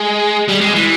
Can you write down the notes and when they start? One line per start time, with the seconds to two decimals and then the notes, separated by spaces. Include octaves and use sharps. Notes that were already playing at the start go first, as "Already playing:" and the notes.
Already playing: G#3
0.48 G3
0.61 G#3
0.73 E3